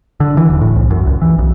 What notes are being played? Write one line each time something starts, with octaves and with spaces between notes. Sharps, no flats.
D3
E3
D#1
A2
C2
F#2
C#2
E3
B1